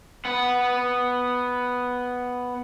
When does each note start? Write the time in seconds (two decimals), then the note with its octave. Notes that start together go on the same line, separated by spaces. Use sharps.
0.25 B3 F#5